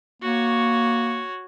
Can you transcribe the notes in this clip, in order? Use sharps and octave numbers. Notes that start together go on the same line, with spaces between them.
A#3 F#4 C#5